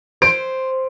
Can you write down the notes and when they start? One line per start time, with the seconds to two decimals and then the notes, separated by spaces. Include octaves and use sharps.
0.22 C5 D7